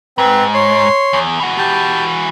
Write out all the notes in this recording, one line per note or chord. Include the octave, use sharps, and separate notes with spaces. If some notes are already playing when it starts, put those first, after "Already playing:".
G#2 C4 B4
C#5 C6
E2
E3 F#4
G4 A5